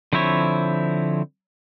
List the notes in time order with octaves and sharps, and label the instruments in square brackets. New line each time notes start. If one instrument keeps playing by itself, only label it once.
[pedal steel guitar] D3 F3 C4 E4 C#5